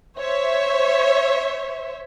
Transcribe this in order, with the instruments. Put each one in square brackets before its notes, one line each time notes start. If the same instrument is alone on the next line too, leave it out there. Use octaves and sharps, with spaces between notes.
[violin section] C5 C#5 E5